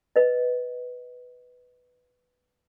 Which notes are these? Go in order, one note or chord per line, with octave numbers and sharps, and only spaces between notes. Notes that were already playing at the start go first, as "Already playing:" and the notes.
B4 D#5